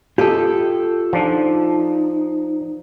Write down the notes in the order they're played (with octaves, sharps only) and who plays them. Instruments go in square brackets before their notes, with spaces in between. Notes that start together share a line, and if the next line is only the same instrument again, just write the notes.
[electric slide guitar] F4 A4 [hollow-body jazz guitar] G4 D#5
[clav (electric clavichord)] F3 D4 [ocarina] D#4